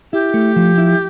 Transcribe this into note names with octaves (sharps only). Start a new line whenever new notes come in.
E4 G4
A3
F3
E4